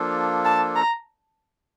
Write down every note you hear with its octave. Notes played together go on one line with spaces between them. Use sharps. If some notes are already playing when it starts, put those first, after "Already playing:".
Already playing: F3 A#3 D4 F4 A4
A5
A#5